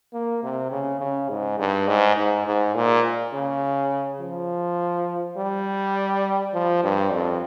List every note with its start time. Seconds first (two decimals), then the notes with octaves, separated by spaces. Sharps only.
0.13 A#3
0.43 C3
0.71 C#3
1.01 C#3
1.29 G#2
1.59 G2
1.88 G#2
2.17 G#2
2.47 G#2
2.75 A#2
3.33 C#3
4.20 F3
5.37 G3
6.54 F3
6.84 G2
7.12 F2